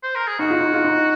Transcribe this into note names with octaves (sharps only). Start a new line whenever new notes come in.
C5
A#4
G#4
D#4 F#4
F4
D#4
F4
D#4